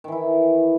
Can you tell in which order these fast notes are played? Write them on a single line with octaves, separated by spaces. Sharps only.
D#3 E3 E4